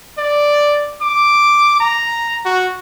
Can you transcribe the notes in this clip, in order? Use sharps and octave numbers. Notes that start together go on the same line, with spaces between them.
D5
D6
A#5
F#4